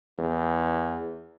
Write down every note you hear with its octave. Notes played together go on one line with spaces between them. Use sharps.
E2